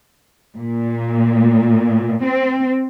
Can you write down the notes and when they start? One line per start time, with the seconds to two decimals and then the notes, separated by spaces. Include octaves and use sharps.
0.57 A#2
2.23 C4